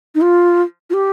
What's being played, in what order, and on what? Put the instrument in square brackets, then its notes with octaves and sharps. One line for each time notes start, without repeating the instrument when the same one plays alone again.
[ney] D#4
F4
F4
G4